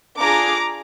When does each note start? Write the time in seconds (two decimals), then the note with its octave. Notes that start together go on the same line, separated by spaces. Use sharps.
0.18 D4 F4 G#4 A#5 D6